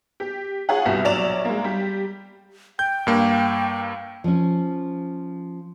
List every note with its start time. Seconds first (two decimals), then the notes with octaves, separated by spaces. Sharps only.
0.20 G4
0.69 F4 G#4 C#5 F#5
0.85 G1 C2 B2
1.04 A#1 F#3 C#5 D5 E7 F7
1.45 G#3 A#3
1.64 G3 G4
2.79 G5 G6
3.07 G2 A#3
4.24 F3 C#4